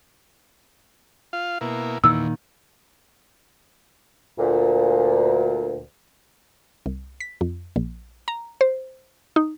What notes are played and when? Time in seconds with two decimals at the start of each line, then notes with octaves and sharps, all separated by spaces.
1.33 F4 F5
1.61 B2 A#3 E4
2.04 E2 A#2 D#3 E6
4.38 D2 A#2
6.86 C2
7.20 B6
7.41 F2
7.76 A#1
8.28 A#5
8.61 C5
9.36 D#4